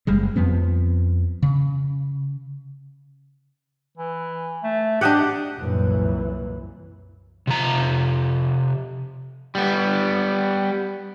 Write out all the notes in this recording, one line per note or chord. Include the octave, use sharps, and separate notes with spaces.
F#1 G3 G#3
F2 F3 B3 C4
C#3
E3
A3
D4 G4 D#5 F#5
C2 F#2 A#2 E3
C3 F3 A#5
G3 B3